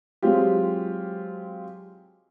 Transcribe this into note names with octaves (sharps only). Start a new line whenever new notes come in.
F#3 G#3 C4 F4 G4